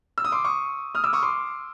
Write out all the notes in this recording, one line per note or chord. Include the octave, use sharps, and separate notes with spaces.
E6
D#6
C6 D6
C#6 D#6
D#6 F6
D6 E6
C#6 D#6
C6 D6